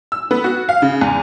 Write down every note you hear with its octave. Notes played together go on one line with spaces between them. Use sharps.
E6
B3
F#4
F5
C#3
E2